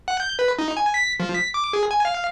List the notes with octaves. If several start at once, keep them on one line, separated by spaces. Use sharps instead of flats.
F#5
G6
B4
D#4
G#5
B6
F3
B6
D6
G#4
G#5
F5